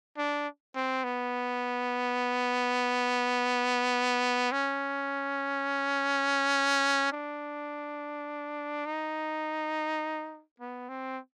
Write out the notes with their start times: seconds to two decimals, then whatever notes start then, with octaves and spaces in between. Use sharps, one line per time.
0.17 D4
0.75 C4
1.04 B3
4.52 C#4
7.12 D4
8.86 D#4
10.60 B3
10.89 C4